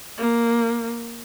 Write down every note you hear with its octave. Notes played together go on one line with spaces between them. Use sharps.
A#3